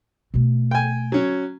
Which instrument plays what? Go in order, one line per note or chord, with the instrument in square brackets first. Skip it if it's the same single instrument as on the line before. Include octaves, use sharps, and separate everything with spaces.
[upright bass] B2 A3
[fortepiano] G5 G#5
F#3 C#4